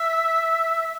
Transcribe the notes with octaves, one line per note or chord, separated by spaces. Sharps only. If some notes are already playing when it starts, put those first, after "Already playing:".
Already playing: E5